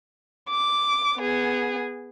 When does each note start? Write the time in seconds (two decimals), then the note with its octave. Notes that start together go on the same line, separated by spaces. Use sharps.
0.49 D6
1.18 B3 G#4